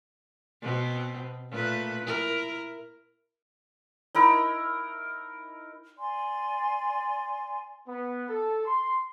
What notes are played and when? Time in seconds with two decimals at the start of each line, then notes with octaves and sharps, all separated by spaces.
0.62 B2 C4
1.51 A#2 A3 B4
2.04 E4 A#4
4.15 D#4 E4 A#4
5.98 D5 G#5 C6
7.88 B3
8.29 A4
8.66 C6